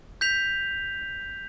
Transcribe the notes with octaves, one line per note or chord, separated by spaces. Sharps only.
G6 B6 F7